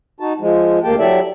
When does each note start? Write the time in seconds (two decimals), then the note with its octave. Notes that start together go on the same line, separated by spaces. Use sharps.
0.20 D#4 F#4 A5
0.40 F3 G#3
0.84 D2 A#3 G4 G5 A5
0.99 F#3 E4 G4 A4 D5 E5